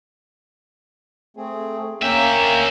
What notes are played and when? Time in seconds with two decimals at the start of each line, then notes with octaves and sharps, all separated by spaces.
1.37 A3 C4 G#4
2.02 D2 A#3 C#4 E5 G5